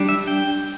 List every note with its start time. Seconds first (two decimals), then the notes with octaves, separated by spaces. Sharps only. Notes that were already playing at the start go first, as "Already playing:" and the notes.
Already playing: G3 D4
0.09 E5
0.28 G5